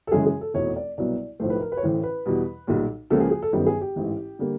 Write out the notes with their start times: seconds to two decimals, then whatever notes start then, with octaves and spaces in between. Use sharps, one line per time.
0.07 A4
0.12 F#2 C#3 E3 G#3 G#4
0.26 G#4
0.41 A4
0.54 F1 E2 B2 C#5
0.76 D5
0.98 C2 B2 F#3 B3 D5
1.40 B1 A2 F3 A3 C5
1.50 B4
1.61 A#4
1.72 B4
1.77 C#5
1.82 A1 A2 E3 C5
2.03 B4
2.26 E2 B2 G3
2.67 B1 A#2 G3
3.10 C#2 C#3 F3 A#3 A4
3.20 G#4
3.31 G#4
3.42 A4
3.52 G1 F#2 D#3 G3 B3 G4
3.66 G#4
3.81 G4
3.96 A1 G#2 E3
4.39 D3 G3 A#3